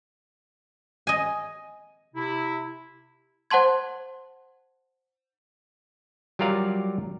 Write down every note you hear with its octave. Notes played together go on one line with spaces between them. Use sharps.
D#5 G#5
C3 E4
C5 F#5 A5 C6 G#6
F#3 G3 F4 A#4 D5 F5